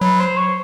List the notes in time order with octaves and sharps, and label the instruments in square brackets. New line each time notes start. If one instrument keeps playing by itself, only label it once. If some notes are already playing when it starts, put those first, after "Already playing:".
[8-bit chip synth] F#3 [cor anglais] B4
[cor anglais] C5
C#5